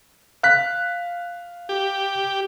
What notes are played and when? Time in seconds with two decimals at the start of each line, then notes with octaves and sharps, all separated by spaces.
0.43 F5 F#6 B6
1.69 G4